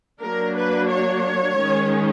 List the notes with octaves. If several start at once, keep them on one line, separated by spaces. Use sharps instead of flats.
F#3 A#3 D4 A#4
B4
C#5
D#3 G#3 C#4